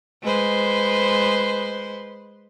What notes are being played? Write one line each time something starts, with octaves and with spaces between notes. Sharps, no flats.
G#3 B4 C5